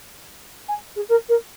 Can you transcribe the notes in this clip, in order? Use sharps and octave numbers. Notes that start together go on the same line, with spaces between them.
G#5
G#4
A#4
A#4